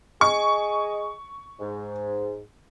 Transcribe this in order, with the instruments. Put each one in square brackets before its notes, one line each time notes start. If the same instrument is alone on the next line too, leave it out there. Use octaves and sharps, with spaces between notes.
[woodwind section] G#4 D#5 G#5 [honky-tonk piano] C#6
[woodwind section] G#2